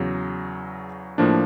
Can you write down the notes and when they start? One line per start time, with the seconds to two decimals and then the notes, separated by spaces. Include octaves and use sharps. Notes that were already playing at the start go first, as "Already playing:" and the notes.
Already playing: E2 C#3 F#3
1.18 A2 F3 A#3 D4